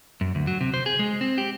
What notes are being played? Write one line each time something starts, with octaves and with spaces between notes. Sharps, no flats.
F#2
D2
F#3
C3
C5
G#4
G#3
C4
G4